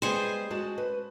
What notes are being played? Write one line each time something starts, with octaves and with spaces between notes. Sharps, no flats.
G3 G#3 B3 G#4 C5
G#3 F#4 A5
B4